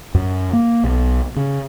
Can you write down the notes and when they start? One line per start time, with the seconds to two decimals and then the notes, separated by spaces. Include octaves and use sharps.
0.15 F#2
0.53 A#3
0.84 B1
1.36 C#3